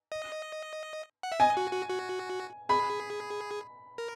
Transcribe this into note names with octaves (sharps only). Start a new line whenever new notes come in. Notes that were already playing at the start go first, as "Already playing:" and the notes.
D#5
F#5
E5
D#5 G#5
F#4
F#4
F#4
G#4 B5
A#4